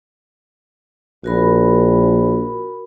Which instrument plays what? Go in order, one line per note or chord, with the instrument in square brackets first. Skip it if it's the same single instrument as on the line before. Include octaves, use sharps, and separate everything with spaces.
[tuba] A#1 [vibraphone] F#4 A#4 B5